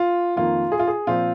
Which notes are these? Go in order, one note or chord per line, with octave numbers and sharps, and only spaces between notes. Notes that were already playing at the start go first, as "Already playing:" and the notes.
Already playing: F4
F2 D#3 A#3 F4
G#4
F4
G#4
A#2 F3 C4 F4